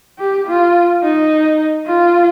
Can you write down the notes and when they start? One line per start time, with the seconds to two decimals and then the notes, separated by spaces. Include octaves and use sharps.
0.19 G4
0.47 F4
1.03 D#4
1.87 F4